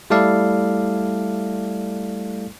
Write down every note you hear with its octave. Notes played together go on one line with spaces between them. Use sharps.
G3 A3 E4 A4 D5 F5